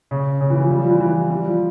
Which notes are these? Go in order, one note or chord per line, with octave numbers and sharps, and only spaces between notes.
C#3
C#3
E3
F3
G3
F3
E3
E3
F3
G3
F3